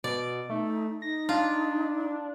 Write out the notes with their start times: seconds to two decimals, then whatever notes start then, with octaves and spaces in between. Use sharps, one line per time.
0.04 B2 D5
0.50 A3 D#4
1.02 D#4 A#6
1.29 D4 F4